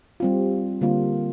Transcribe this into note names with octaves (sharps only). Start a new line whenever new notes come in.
G3 C4 F4
D3 G3 A#3 F4